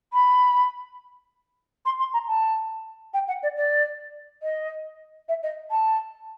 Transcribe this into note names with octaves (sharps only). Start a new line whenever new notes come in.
B5
C6
C6
A#5
A5
G5
F#5
D5
D5
D#5
E5
D#5
A5